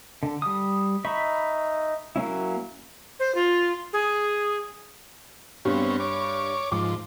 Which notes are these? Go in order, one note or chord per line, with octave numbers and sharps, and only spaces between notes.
D3
G3 D#6
D#4 E5 B5 C#6
F#3 A#3 C#4 E4
C5
F4
G#4
G2 B3 C4 C#5
C#5 D6
G#2 F3 D6